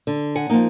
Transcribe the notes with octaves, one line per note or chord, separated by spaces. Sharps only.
D3
F#5 G#5
F3 A#3 D#4